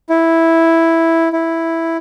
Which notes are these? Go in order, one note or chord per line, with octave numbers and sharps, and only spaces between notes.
E4
E4